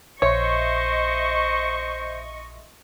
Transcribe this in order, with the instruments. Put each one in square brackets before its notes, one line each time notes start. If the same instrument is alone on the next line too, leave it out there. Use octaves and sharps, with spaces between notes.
[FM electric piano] A#1 E5 C6 [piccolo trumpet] C5 [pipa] C#5 [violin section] D#5 C#6